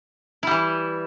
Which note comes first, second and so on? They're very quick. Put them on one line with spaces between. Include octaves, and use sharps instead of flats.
E4 G3 E3